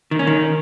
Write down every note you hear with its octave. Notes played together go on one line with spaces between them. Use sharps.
D#3
C#4
D#3